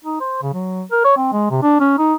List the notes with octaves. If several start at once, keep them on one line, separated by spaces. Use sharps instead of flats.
D#4
C5
C#3
F#3
A#4
C#5
C4
G#3
C3
D4
C#4
D#4